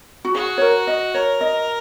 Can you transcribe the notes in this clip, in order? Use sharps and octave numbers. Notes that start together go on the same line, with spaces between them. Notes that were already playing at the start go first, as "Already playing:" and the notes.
F#4
F#4 G#4
C#5
A#4
D#5
A#4 C#5
D#5